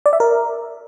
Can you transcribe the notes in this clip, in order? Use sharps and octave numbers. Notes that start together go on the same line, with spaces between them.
D5
E5
A#4